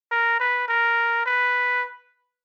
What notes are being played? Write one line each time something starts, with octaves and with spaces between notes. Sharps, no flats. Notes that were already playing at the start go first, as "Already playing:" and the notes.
A#4
B4
A#4
B4